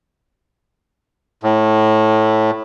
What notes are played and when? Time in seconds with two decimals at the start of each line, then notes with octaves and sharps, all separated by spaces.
1.43 A2